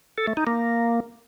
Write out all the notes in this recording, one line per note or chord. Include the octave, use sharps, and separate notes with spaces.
A4
A3
D#4
A#3